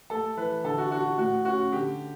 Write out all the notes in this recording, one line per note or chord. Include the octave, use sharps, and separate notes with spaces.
A3 A4
E3 B4
D3 A4
F#4
D4 F#4
F#4
A2 F#4
C#4 F#4
D3 G4